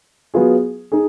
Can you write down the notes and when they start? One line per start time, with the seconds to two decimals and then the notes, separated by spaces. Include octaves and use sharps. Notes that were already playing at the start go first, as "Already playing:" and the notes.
0.34 F#3 B3 F4 G#4
0.92 D#4 G#4